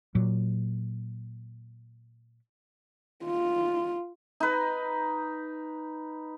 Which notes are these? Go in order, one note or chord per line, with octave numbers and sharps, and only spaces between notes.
A#2 F#3
F4
D#4 B4